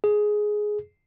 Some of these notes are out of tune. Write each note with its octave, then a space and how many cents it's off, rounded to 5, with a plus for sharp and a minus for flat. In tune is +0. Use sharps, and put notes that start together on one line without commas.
G#4 +10